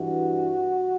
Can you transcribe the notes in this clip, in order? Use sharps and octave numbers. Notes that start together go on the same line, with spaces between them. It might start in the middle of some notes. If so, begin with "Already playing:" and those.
Already playing: G2 E3 F#4